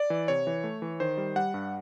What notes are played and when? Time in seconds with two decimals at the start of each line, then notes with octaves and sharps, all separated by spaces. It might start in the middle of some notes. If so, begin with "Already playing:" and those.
Already playing: D5
0.10 E3
0.28 C3 C#5
0.47 E3
0.64 A3
0.82 E3
1.00 D#3 C5
1.17 G3
1.36 G3 F#5
1.54 G2